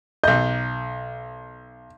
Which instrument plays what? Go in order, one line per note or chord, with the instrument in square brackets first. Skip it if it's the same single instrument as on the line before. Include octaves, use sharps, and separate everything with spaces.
[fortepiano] B1 D#5 [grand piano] G6